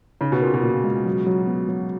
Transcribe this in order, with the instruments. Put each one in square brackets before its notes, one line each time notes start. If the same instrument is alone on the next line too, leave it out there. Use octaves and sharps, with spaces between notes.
[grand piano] C#3 [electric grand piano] D#4
[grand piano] B2
[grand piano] A#2 [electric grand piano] A#4
[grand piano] B2
[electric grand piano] A#2
G#3
F#3
F#3
B3
F#3